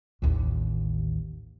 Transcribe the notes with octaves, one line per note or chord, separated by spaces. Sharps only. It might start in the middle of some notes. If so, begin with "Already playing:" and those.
A1 D#2